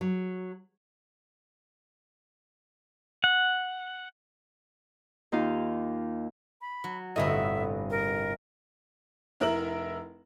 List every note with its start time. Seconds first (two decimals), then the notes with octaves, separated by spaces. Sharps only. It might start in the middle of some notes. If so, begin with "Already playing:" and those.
0.01 F#3
3.24 F#5
5.32 D#2 D#4 F4 F5
6.61 B5
6.84 F#3
7.16 G1 A2 C3 B3 D#5 E5
7.90 A#4
9.40 F1 E4 A#4 E5 E6 F#7